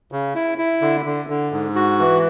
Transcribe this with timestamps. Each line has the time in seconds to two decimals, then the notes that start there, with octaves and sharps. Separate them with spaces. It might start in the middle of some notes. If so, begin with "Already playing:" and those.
0.12 C#3
0.35 E4
0.58 E4
0.81 D3
1.05 D3
1.29 D3
1.52 G#2
1.75 F#4
1.99 E3